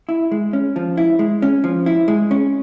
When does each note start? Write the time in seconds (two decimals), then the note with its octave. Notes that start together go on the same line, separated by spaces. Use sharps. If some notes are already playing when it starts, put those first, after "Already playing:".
0.09 E4
0.32 G#3
0.53 C#4
0.76 F3
0.97 E4
1.19 G#3
1.42 C#4
1.64 F3
1.86 E4
2.08 G#3
2.31 C#4